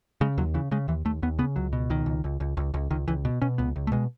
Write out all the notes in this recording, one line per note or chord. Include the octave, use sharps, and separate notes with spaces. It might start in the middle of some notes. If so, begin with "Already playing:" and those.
C#3 G#3
D#2 F#3
C#3 E3
C#3 G#3
D#2 E3
D#2 A3
D#2 B3
C#3 B3
C#2 F#3
B2
C#2 D#3
C#2
C#2
C#2
C#2
C#2
C#2 D#3
C#2 E3
B2
B2 C#4
C#2 B3
C#2
A3
B2 G#3